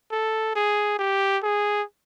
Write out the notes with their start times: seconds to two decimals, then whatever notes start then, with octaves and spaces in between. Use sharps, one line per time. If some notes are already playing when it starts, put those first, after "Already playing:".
0.12 A4
0.55 G#4
0.99 G4
1.43 G#4